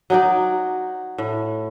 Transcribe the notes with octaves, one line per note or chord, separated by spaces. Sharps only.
F#3 D#4 D5
A2